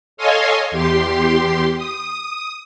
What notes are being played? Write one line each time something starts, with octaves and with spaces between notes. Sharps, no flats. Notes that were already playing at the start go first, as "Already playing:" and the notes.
A4 C#5 D#5 F5 G#5 C6
E2 G4 C6
D#6